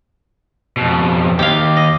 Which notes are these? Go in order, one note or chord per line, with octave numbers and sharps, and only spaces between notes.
F2 B2
D#2 G4 F5
D#5